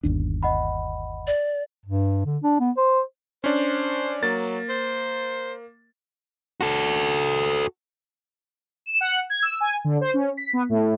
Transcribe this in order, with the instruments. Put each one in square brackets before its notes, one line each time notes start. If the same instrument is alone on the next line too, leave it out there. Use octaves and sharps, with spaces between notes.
[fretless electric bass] G1 D#2 D4
[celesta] D#5 F#5 B5
[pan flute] D5
[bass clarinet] G2
D3
D4
B3
C5
[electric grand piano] C#4 D4 [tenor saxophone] C5
[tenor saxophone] F#3 [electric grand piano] A#3 A6
[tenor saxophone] C5
[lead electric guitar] F#4 A4
[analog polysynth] E7
F#5
G#6
E6
G#5
D3
C5
C#4
B6
B3
A2